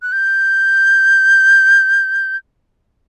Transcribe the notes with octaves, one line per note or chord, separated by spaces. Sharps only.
F#6
G6